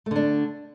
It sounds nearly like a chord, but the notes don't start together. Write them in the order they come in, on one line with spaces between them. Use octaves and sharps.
A3 D3 D4